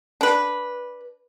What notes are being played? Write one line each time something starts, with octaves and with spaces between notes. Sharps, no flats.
D4 B4